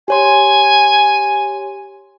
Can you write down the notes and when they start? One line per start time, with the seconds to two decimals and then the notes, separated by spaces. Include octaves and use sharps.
0.08 G4 C#5 G#5 C6